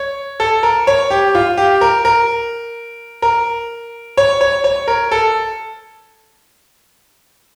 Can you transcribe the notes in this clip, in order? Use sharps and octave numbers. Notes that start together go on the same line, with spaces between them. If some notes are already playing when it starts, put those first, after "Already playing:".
Already playing: C#5
A4
A#4
C#5
G4
F4
G4
A#4
A#4
A#4
C#5
C#5
C#5
A#4
A4